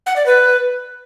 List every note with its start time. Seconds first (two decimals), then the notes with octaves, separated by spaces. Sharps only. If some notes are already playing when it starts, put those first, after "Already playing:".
0.06 F#5
0.16 D5
0.26 B4